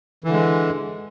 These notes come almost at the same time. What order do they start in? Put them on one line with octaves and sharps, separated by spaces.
E3 D3 G#3